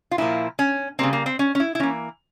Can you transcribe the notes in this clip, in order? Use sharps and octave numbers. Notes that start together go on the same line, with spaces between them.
F4
A#2 F3 A#3 E4
C#4
C#3 G3 A#3 C4
A#3
C4
C#4
C#4
E4
E4
E3 A#3 C#4